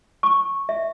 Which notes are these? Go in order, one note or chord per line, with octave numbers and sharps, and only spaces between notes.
C#6
E5